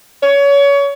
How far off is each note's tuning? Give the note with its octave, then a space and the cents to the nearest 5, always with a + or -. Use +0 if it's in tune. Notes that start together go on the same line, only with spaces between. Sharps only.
C#5 +25